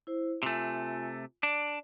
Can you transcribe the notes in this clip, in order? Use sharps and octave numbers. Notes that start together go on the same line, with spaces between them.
E4 C5
C3 A3 F4 G#5
D4 D5